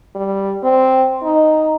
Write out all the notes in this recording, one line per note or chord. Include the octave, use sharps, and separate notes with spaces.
G3
C4
D#4